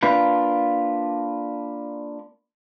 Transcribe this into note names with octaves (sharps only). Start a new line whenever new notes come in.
A#3 D4 F4 B4